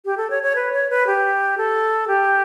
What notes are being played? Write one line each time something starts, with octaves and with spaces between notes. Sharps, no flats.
G4
A4
C#5
C#5
B4
C#5
B4
G4
A4
G4